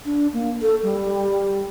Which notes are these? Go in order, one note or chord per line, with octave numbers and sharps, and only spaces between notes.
D4
A#3
A4
G3